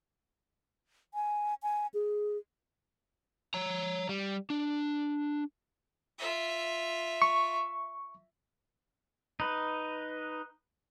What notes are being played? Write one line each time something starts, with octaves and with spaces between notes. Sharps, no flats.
G#5
G#5
G#4
C#5 A#5
G3
D4
F4 E5
C#6
D#4 B4